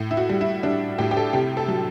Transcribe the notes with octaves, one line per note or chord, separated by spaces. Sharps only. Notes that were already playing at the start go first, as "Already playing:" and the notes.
Already playing: A2
E4
F#4
G3
E4
G3 D4
A2 G4
G4
A4
C3 G4
A4
F#3